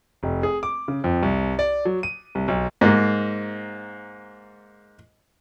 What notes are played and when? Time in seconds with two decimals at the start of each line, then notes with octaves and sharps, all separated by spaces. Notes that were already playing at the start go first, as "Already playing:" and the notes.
0.23 F1
0.43 G#4
0.63 D6
0.88 C#3
1.04 F2
1.23 C2
1.59 D5
1.85 F#3
2.03 D#7
2.35 C2
2.48 B1
2.81 G#2 A#3